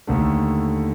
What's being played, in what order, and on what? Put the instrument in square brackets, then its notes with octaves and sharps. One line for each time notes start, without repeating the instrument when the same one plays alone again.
[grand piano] D#2 D3 A3